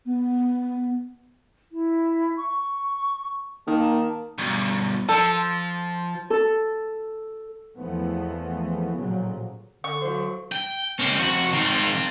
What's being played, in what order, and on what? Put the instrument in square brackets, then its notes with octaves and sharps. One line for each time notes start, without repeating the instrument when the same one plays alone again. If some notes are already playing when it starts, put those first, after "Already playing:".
[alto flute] B3
[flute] E4
C#6
[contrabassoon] D#3 [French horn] A#3 [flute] A5
[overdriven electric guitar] G2 B2
[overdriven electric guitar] F3 [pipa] A4
[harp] A4
[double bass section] E2 E3 F3 A3 B3
A1 A#2 C#3 F3 F#3
[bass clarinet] D3 [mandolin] C#6
[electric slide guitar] F#3 C5
[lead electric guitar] G5
[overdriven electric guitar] C#2 C#4 [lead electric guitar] A#3 C4
[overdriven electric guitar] F2 C3 [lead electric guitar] F#4
[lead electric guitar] G#2 D#3 [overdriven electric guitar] C4 F4